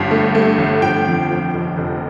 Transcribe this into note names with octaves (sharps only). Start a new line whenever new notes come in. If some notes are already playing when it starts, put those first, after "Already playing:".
Already playing: G1 G2 F3 F5
A3
A3
G1
F3 G5
F2
F3
F1
F1